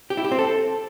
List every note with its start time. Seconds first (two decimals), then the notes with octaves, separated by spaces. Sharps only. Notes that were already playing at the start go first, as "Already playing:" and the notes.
0.10 G4
0.17 E4
0.24 G4
0.32 C4
0.39 A4